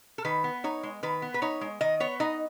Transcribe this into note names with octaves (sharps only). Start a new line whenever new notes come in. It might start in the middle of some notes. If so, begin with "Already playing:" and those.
A4
D#3 B4
B3
D#4 C#5
G#3
D#3 B4
B3
B4
D#4 C#5
G#3
D#3 D#5
B3 C#5
D#4 D#5